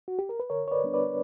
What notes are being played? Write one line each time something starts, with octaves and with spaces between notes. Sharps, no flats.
F#4
G4
A#4
B4
D3 A#4 C#5
C#5
B4 D5
G3 B3 D4
B4 D5